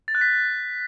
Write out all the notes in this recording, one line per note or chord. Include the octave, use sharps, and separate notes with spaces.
A6
F#6
B6